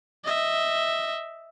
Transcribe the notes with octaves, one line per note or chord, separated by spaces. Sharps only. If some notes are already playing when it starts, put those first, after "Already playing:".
D#5 E5